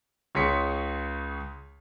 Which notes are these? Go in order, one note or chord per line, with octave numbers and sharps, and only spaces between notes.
C#2 G#4 C#5 C6 B6 C#7